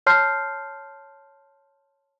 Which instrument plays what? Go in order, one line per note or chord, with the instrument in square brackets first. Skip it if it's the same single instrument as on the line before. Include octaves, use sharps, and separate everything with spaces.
[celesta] C#5 A5 C6 F6 G6 C7